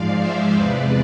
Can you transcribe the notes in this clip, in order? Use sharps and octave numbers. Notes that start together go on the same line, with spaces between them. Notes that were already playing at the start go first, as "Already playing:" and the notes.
Already playing: G#2 F3 G#3 D5 F5
C5 E5
E2 C3 G#3 B4 D5